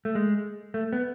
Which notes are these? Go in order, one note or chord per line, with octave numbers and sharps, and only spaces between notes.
A3
G#3
A3
B3